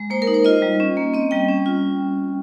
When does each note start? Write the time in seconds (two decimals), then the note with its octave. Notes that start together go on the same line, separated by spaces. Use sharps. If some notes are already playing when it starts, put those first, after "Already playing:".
Already playing: G#3
0.10 A#3 C5
0.22 A#4
0.27 D#4
0.34 C5
0.44 F4 D#5
0.62 G3
0.80 C#4
0.97 A#3
1.14 C4 D#5
1.31 G3 G5
1.49 C#4
1.66 F4